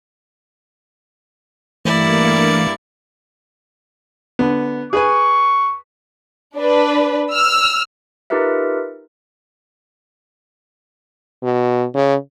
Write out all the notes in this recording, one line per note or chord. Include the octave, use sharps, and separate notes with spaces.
G2 E3 A3 A#3 E4 D5 C#7
D3 B3
G#4 B4 G#5 C#6
D4 B4
E6 F6
D#4 F4 G4 A#4 B4 E5
B2
C#3